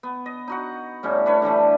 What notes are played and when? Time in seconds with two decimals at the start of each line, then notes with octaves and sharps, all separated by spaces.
0.03 B3
0.26 D#5
0.48 D#4 F#4 F#5
1.03 A2 G3 C#4 D#4
1.26 D4 B4 C#5
1.42 D3 E3 G3 A3